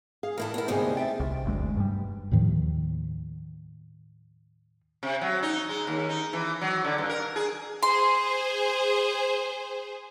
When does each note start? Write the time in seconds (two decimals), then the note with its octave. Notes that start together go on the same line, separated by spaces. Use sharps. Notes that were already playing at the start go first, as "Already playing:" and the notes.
0.23 G#4 F5
0.38 A2 E3 E4 A4 A#4
0.54 B3 E4
0.68 D2 G2 C3 B3 D#4 G#4 C5
0.97 E5 G5 A6
1.20 C2
1.45 F#1 D2 G#3
1.77 G2 G3
2.31 D#2 A2 D#3 F3
5.03 C3
5.21 F#3
5.43 D#4
5.69 G#3
5.87 D#2
6.09 D#4
6.33 E3
6.61 F#3
6.84 D3
6.98 G2
7.09 A#4
7.36 G#4
7.83 G#4 C5 C6